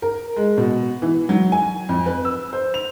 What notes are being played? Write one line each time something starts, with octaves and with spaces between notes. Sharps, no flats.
A#4
G#3
B2
E3
F#3
G#5
F2
B4
E6
C5
F7